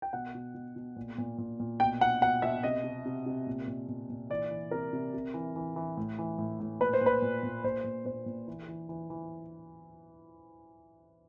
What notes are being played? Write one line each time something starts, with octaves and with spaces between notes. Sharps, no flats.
G5
B2 F#5
B2
B2
B2
A#2
A#2
A#2
A#2
B2 G5
B2 F#5
B2 F#5
B2 E5
C3 D#5
C3
C3
C3
A#2
A#2
A#2
A#2
E3 D5
E3
C3 A#4
C3
C3
E3
E3
E3
A2
E3
A2
A2
A#2 B4
C5
A#2
B4
A#2
A#2
A#2 C5
A#2
A#2 C5
A#2
E3
E3
E3
E3